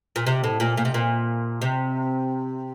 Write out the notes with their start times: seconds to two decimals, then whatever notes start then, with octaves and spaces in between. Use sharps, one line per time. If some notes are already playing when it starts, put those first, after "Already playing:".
0.16 A#2
0.27 C3
0.44 A2
0.60 A#2
0.77 A#2
0.85 C3
0.94 A#2
1.61 C3